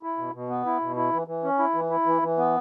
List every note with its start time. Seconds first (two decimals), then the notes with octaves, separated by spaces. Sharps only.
0.03 E4
0.18 B2
0.34 B2
0.49 B3
0.66 E4
0.81 B2
0.96 E4
1.13 E3
1.27 E3
1.44 C#4
1.59 E4
1.74 E3
1.90 E4
2.06 E3
2.22 E3
2.38 B3